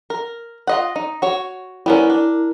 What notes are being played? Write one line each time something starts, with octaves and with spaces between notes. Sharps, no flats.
A#4
F4 D#5 F#5
D#4
F#4 C#5
G3 B3 C#4 E4 A#4
D4